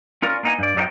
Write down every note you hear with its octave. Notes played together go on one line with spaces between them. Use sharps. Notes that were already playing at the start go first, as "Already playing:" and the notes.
C#4 F4 A#4 D5
A#3 B3 D#4 F#5 G#5
G2 D5
F#2 A3 D#4 F#4 C5 G5